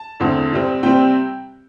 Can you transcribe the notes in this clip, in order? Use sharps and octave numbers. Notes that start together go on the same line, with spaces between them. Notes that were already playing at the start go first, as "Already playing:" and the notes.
Already playing: A5
E2 D3 A3 C4
C3 G3 C4
C3 G3 C4 G5